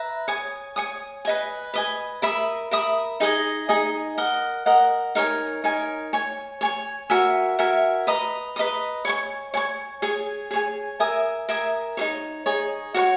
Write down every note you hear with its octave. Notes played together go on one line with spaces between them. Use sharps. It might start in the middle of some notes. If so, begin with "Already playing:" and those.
Already playing: B4 E5 A#5
C#5 G#5 D#6
C#5 G#5 D#6
B4 D#5 G#5
B4 D#5 G#5
A#4 E5 B5 D#6
A#4 E5 B5 D#6
D#4 G#4 D#5 G#5
D#4 G#4 D#5 G#5
A#4 D#5 F#5
A#4 D#5 F#5
D#4 A#4 C#5 G#5
D#4 A#4 C#5 G#5
C#5 G#5 C#6
C#5 G#5 C#6
F#4 A#4 E5 G#5
F#4 A#4 E5 G#5
B4 D#5 A#5 D#6
B4 D#5 A#5 D#6
C#5 G#5 C#6
C#5 G#5 C#6
G#4 C#5 G#5
G#4 C#5 G#5
A#4 E5 G#5 D#6
A#4 E5 G#5 D#6
D#4 G#4 C#5
D#4 G#4 C#5
F#4 C#5 F#5 C#6